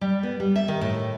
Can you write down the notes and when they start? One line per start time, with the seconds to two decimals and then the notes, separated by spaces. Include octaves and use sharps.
0.01 G3
0.23 B3
0.40 G3
0.56 E5
0.68 D#3
0.81 A2